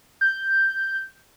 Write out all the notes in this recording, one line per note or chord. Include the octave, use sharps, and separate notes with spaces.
G6